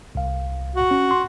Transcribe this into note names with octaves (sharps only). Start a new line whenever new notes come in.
C2 F5
F#4
C#4
C6